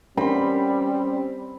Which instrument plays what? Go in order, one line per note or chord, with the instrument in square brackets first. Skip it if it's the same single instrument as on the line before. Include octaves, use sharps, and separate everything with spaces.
[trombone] G3 [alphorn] C4 [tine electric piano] C#4 C6 [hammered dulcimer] B5